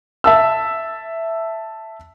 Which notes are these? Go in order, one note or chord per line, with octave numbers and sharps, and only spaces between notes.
E5 A5 E6